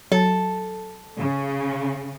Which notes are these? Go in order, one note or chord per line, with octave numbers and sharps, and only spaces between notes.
F#3 A4
C#3